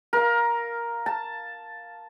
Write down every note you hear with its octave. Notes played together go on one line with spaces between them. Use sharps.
A#4 F5
A5